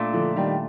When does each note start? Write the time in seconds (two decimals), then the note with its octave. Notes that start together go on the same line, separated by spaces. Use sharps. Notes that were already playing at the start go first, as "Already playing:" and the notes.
Already playing: A#2 A3 D4 F4
0.13 D3 F3
0.36 D#3 G3